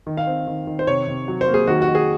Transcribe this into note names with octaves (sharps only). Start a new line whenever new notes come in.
D#3
F5
C4
D#3
D#3
C5
C3 C#5
C3
F#3
C5
A#3
G#4
D#3 F#4
F#4
D#3
G#4